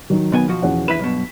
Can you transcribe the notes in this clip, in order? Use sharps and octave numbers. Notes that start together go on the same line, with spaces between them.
D#3 F#3
B2 B3 G#5
B2 F3 F#4
E2 C#4 F#5
E2 E4 B4 B6 E7
B1 G2 B2